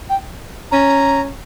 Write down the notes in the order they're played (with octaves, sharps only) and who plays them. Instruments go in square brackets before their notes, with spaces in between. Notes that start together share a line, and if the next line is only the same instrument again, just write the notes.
[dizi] G5
[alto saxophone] C#4 [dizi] A#5